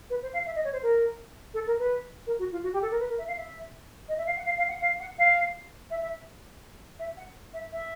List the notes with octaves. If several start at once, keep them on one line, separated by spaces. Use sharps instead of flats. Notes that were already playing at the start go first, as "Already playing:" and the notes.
B4
C5
F5
E5
D#5
C#5
C5
A#4
A4
A#4
B4
A#4
F#4
F4
F#4
G4
A4
A#4
B4
A#4
E5
F5
E5
D#5
E5
F5
F#5
F5
F5
F#5
F5
F#5
F5
E5
E5
E5
F#5
E5
E5